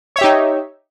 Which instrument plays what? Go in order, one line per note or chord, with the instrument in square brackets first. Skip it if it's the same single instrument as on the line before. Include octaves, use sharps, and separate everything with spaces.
[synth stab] C#5
E5
G4
D#4